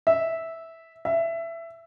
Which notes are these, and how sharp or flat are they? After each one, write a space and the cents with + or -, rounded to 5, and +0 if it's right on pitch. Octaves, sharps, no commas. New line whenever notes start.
E5 -10
E5 +15